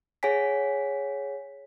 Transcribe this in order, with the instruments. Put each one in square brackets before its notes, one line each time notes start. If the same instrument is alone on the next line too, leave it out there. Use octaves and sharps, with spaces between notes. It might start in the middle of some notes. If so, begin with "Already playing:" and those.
[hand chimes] G#4 C#5 F#5 G#5 B6